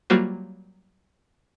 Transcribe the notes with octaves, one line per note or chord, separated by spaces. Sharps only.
F#3 G3 A#3 F4 F#4 C5